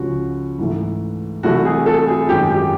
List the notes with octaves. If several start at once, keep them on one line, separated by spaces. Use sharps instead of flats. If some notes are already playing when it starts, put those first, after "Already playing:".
Already playing: C#2 C#3 F3 F#4
G#2 E3 A3
C2 C3 E3 A3 F#4
G#4
A4
G#4
F#2 D#3 G#3 G4
G4